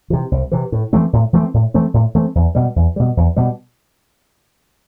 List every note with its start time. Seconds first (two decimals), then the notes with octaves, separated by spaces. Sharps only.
0.10 C3 E3
0.32 C2
0.52 C3 E3
0.72 A2
0.93 E3 A3 C4
1.13 A2
1.33 E3 A3 C4
1.54 A2
1.74 E3 A3 C4
1.94 A2
2.15 E3 A3 C4
2.35 E2
2.55 B2 G3
2.76 E2
2.96 B2 G3
3.17 E2
3.36 B2 G3